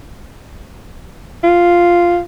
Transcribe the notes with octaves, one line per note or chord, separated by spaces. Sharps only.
F4